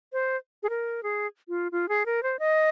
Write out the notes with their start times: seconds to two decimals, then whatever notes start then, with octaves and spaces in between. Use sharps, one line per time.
0.13 C5
0.63 G#4
0.70 A#4
1.03 G#4
1.49 F4
1.72 F4
1.89 G#4
2.06 A#4
2.23 C5
2.39 D#5